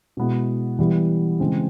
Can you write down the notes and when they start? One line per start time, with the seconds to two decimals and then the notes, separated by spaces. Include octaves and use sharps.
0.17 B2 G#3 B3 E4
0.79 E3 G3 B3 E4
1.40 C#3 E3 G#3 C4